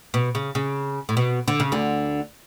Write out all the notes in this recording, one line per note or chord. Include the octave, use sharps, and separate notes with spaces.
B2
C#3
C#3
A2
B2
D3
C#3
D2 D3